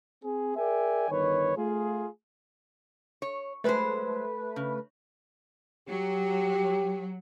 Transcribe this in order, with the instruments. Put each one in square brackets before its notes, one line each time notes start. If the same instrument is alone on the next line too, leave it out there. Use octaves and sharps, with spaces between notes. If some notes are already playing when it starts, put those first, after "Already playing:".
[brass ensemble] C4 G#4
G#4 A#4 D5 E5 G5 G#5
G1 D#3 B4 C#5
A3 F4 G#4
[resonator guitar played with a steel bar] C#5
[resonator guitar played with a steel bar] F#3 G#3 C5 [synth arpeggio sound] A3 B4
[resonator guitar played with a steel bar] C#3
[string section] F#3 [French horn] G4